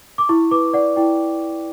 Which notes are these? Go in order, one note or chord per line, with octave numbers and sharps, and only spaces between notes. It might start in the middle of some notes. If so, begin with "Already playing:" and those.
D6
E4 C#6
B4 D6
D5 F#5
E4 G5